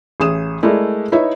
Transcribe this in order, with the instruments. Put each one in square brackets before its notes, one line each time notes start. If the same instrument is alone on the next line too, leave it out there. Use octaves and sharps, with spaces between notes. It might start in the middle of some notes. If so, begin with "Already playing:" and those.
[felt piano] A1 G#4 D#6 E7
G#3 A3 E4 A#4 D5
D#4 E4 B4 C#5 E5